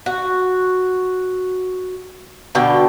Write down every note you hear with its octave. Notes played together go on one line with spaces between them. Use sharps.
F#4
B2 D3 G5